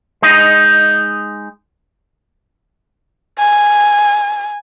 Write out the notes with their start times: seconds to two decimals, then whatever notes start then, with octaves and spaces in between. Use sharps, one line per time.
0.22 G#3 D#4 D#5
3.39 G#5